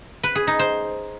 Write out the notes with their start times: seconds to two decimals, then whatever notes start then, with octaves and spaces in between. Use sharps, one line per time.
0.24 B4
0.35 G#4
0.47 D#4
0.59 C5